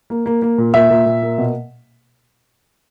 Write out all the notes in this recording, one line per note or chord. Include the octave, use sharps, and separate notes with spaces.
A#3
A#3
A#3
A#2
A#2 E5
A#2
A#2
A#3
B2